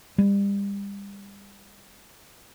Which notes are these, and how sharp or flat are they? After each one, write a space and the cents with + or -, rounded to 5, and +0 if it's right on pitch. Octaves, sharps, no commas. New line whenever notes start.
G3 +35